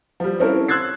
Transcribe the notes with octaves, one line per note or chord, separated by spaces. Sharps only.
F3 G3
C4 C#4 E4 A4 A#4
C6 E6 F#6 G#6 A6 C7